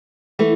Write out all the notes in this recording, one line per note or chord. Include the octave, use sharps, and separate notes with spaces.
E3 A3